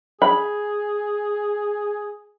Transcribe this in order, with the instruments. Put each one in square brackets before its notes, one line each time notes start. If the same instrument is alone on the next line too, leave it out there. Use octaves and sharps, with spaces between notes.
[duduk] G#4 [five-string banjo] B5